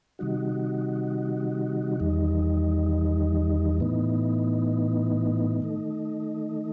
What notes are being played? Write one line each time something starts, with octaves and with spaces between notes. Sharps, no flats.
C3 D#3 G3 D#4 F#4
E2 D#3 G3 D#4
A2 E3 B3 D#4
D#3 A3 D#4